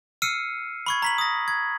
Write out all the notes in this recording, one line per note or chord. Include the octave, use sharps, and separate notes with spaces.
E6 F6 C7 C#7 D#7
B5 C#6 G#6
A#5 B6 F#7
D#6 A#6
G#6